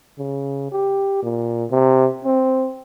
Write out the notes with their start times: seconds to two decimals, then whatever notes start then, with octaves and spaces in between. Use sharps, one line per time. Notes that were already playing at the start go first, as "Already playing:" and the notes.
0.19 C#3
0.72 G4
1.23 A#2
1.71 C3
2.25 C4